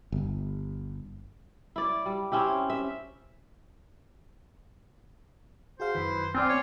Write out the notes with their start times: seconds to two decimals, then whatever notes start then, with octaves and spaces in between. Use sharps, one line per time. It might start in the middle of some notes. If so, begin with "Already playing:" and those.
0.12 G1
1.76 E4 D5
2.06 G3
2.32 C4 C#4 E4 G4
2.70 E5
5.80 F#4 G#4 C5 F5
5.95 F#2 D#3 E4 B4
6.35 C4 F4 D5 G#5 C6
6.49 C#5